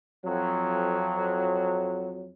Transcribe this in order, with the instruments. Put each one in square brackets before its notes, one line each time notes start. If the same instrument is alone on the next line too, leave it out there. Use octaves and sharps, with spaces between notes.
[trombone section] F2 F#3